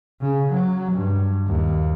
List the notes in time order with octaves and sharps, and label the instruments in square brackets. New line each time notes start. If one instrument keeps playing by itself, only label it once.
[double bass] C#3
F#3
G2
D#2